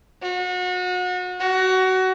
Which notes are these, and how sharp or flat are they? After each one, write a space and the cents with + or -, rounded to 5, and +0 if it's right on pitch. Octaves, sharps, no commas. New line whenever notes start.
F#4 -35
F#4 +20